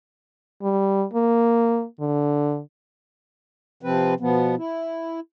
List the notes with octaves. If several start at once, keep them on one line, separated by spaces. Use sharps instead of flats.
G3
A#3
D3
C3 F3 C4 B4
B2 F3 B3
E4